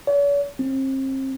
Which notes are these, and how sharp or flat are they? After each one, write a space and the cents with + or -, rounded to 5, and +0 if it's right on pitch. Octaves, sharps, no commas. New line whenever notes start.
C#5 +45
C4 +35